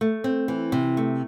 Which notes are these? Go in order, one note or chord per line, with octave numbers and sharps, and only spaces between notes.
A3
C4
E3
C3
A3